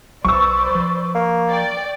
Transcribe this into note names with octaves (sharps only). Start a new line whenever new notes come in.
B1 F#3 B4 C5 D5 C#6 E6
F3
A#3
D5 G5